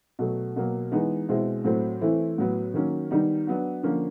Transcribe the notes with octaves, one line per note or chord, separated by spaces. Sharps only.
B2 F#3 A3
B2 F#3 A#3
E3 G#3 B3 D#4
B2 G#3 C4 E4
A2 F#3 A3 C4
E3 A3 C4 E4
A2 F#3 B3
D#3 F#3 A#3 C#4
D#3 G3 B3 D#4
F#3 B3 D4
D3 F3 A#3 C#4